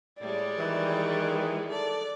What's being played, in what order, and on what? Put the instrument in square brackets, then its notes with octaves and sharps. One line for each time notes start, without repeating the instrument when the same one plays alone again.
[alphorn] A2 [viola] G3 G#3 [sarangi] D5
[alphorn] D#3 [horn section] E3
[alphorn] A4 [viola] D5